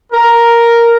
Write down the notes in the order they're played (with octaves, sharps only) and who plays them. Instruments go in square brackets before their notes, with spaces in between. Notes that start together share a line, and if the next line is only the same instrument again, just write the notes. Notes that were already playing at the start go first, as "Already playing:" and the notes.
[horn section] A#4